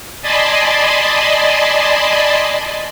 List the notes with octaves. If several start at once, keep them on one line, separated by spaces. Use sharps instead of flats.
D5 D#5 G#5 A5 B5 C6